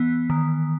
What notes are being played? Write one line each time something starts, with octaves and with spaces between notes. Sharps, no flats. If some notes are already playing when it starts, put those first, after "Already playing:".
Already playing: E3 B3
D#3